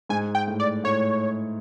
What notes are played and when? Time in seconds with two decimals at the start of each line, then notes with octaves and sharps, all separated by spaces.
0.09 G#2 G#5
0.35 G5
0.48 A2
0.60 D5
0.84 A2 C#5